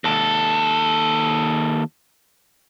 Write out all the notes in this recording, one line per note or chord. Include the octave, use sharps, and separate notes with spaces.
D#2 A4